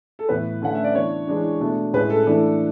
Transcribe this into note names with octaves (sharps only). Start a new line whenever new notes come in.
A4
A2 E3 B3 B4
D3 A3 C#4 F#5
E5
D5
E3 B3 D4 C#5
E3 G#3 D4
B2 A3 D4
A2 G#3 C#4 B4
A4
E3 A3 D4